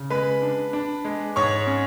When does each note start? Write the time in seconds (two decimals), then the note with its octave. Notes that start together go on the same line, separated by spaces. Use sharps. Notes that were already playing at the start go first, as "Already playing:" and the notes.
Already playing: C#3
0.10 G#3 B4 B5
0.42 D4
0.73 D4
1.05 G#3
1.36 G#2 C#5 C#6
1.67 C#4